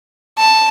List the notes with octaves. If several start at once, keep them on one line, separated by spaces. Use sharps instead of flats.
A5